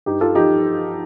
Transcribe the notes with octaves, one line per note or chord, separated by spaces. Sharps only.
G2 D#4 G4
F4 A4
F3 D#4 G4